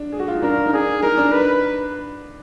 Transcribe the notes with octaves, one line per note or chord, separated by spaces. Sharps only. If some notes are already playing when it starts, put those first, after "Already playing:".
Already playing: D4
G#4
F#4
F4
D#4
D4 A#4
D#4
D4 G#4
D#4 A#4
D4
B4